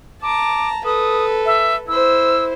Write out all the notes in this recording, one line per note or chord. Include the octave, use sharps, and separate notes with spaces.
A5 A#5 D6
A4 B4 D#6
E5
E4 C5 E6